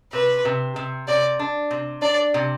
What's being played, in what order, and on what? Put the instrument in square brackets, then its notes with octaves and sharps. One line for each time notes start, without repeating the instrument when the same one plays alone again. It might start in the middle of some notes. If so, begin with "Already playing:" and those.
[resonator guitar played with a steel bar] C3 [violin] B4
[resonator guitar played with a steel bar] C3
C3
[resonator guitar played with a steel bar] C3 [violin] D5
[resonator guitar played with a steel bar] D4
C3
[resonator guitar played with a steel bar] D4 [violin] D5
[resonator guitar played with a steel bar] C3